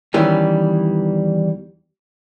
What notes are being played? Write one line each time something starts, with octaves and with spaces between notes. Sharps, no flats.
E2 D#3 E3 G3 C#4